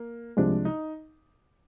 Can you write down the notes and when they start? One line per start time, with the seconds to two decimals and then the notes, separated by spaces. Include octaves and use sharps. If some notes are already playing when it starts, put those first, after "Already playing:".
Already playing: A#3
0.37 C2 C3 F3 G#3 D4
0.65 D#4